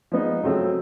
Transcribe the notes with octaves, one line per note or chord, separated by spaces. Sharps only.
F3 G#3 B3 D#4
C#3 F#3 A3 C4